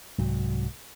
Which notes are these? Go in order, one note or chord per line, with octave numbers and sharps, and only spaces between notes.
C2 G#2 F#3